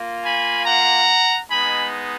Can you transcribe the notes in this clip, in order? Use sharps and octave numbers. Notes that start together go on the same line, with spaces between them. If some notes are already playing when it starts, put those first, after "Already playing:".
Already playing: A#3 F4
G#5 B5
F#5 A#5
G#3 B3 D#4 G#5 B5